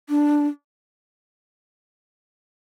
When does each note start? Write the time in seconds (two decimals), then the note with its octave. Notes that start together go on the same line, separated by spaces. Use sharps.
0.09 D4